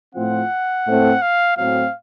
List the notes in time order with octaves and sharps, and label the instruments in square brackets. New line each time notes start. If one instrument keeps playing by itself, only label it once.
[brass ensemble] A2 F3 C4 F4 [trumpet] F#5
[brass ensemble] A2 A3 C4
[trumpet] F5
[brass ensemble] A2 F#3 C4 [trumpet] F5